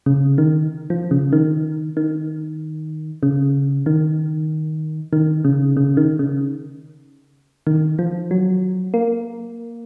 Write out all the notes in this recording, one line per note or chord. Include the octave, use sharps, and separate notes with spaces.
C#3
D#3
F3
C#3
D#3
D#3
C#3
D#3
D#3
C#3
C#3
D#3
C#3
D#3
F3
F#3
A#3